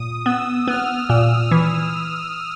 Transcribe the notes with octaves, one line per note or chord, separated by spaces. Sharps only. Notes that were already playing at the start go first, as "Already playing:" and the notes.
Already playing: A#2 D#6
B3 E6
B3 F6
A#2 E6
E3